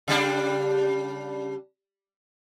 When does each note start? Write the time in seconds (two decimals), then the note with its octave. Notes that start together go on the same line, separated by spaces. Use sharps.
0.08 C#3 G3 D4